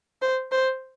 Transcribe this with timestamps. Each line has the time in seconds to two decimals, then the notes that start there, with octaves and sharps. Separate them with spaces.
0.22 C5
0.52 C5